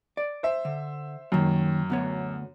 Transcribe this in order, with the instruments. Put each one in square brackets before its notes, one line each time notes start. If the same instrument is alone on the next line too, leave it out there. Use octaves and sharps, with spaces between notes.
[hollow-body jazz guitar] D5
[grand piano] C5 E5
[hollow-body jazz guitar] D3
[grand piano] F#2 [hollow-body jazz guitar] D#3 A#3
[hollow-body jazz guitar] D2 B3 C#5